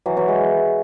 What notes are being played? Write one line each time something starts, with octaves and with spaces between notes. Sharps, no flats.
E3 F#3
E3 F#3
G#3